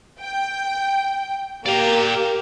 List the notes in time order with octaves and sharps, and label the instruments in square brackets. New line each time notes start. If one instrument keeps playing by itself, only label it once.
[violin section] G5
[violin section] A#3 [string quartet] G4 [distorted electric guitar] D5 F5